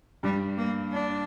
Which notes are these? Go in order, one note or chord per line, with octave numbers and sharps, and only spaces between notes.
G2 G3
A#3
D4